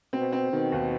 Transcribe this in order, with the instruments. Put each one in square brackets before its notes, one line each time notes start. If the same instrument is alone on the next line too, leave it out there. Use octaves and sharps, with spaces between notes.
[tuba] B2 [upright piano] C4
[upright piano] C4
[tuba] B2 [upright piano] D#3
[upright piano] D#2